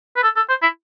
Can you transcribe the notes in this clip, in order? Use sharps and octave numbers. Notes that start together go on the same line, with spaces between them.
B4
A4
A4
C5
E4